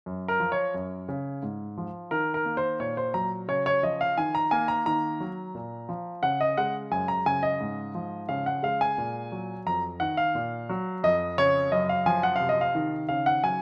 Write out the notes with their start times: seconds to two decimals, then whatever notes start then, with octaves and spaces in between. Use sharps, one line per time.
0.06 F#2
0.28 A#4
0.40 F3
0.52 C#5
0.74 F#2
1.09 C#3
1.43 G#2
1.77 F3
2.11 D#3 A#4
2.34 A#4
2.45 A#3
2.57 C5
2.80 A#2 C#5
2.97 C5
3.14 F#3 A#5
3.48 C#3 C#5
3.66 C#5
3.83 F3 D#5
4.01 F5
4.18 D#3 G#5
4.35 A#5
4.51 A#3 G#5
4.68 A#5
4.86 D#3 A#5
5.20 F#3
5.55 A#2
5.89 F3
6.23 C#3 F#5
6.41 D#5
6.57 G#3 F#5
6.91 F#2 G#5
7.08 A#5
7.26 C#3 G#5
7.43 D#5
7.60 G#2
7.95 F3
8.29 C#3 F5
8.46 F#5
8.63 G#3 F5
8.81 G#5
8.98 A#2
9.32 F#3
9.66 F2 A#5
10.00 D#3 F#5
10.17 F5
10.35 A#2
10.69 F#3
11.03 F2 D#5
11.38 C#3 C#5
11.72 F#2 D#5
11.89 F5
12.06 F3 G#5
12.23 F#5
12.36 C3 F5
12.49 D#5
12.61 F5
12.75 D#3
13.09 C#3 F5
13.26 F#5
13.44 F#3 G#5